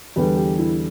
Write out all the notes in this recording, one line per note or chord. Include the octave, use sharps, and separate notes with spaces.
E2 D3 G3 B4
G4
E4